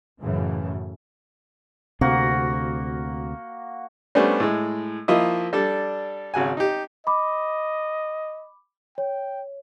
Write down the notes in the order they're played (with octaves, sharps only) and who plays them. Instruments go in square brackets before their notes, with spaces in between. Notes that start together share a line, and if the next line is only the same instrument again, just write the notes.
[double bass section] F#2 A2 C#3 E3
[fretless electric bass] D2 C3 C4 [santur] A#3 F#4
[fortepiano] G3 A3 B3 C#4 D4 C5
A2 G#3
F3 A#3 E4 D#5
G3 D4 A4
G#1 C#3 F#4 G#5
D#4 G4
[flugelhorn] D#5 [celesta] B5 D6
[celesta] C#5 [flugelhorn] G5